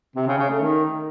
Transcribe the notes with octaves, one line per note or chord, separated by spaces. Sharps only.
C3
C#3
C#3
A3
D#3